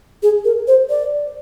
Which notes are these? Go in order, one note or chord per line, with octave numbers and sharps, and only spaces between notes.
G#4
A#4
C5
D5